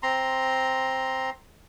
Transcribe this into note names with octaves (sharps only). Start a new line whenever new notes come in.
C4 A#5 C6